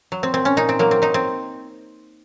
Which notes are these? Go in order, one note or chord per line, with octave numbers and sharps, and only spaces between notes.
F#3
C4
A#2 C4
C#4
A#2 D#4
C4
F#3 A#3
C4
F#3 D#4
C4